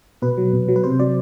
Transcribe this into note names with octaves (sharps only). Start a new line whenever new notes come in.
B2 B4
F#3
B2
F#3
B4
C3 C5
F#3 D5